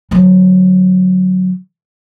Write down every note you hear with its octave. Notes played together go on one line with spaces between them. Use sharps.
D3 F#3